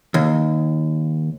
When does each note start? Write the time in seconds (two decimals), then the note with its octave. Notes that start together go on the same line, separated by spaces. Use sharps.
0.14 D#2